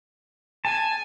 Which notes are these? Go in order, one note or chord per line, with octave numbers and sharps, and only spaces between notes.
G#5 A5